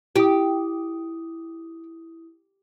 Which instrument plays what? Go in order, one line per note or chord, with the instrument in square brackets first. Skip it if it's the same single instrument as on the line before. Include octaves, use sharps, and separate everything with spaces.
[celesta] E4 D#6 [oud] G4